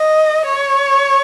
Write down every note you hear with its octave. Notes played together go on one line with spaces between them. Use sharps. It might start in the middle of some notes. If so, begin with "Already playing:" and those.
Already playing: D#5
C#5